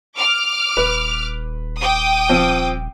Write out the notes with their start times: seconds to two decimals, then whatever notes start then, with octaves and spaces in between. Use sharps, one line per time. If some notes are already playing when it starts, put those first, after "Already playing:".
0.17 D6 F6
0.77 D#1 B4
1.79 G5 D6 D#6
2.29 F3 C4